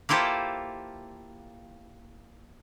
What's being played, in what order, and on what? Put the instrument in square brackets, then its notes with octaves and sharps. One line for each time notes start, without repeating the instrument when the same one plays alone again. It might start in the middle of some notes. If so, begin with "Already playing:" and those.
[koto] A#3 E4 F4 G4 A4 C5